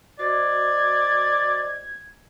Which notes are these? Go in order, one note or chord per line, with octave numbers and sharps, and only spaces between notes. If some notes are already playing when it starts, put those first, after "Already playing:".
F#4 C5 D5 D#5 G#6